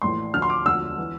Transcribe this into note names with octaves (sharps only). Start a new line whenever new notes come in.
A#1 A2 E3 C6
D2 D3 F3 F6
C6
D6
E1 D2 D3 F3 E6
E3